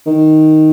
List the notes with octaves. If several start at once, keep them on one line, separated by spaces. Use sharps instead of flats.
D#3